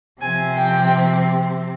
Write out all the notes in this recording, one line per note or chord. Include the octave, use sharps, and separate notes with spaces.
C3 F3 C4 G#5
G5